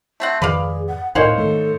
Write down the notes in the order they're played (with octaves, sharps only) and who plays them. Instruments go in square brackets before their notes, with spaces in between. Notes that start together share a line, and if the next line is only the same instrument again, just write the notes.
[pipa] A3 C4 F#5
[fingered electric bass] F2 G#2 D#3 [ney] G#4 [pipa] B4 D5 F5
[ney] F#5
[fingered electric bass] D2 A2 [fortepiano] D#4 C5 C#5 [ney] A#4 [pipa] F5 F#5
[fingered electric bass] G#2 D#3 A3 [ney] A4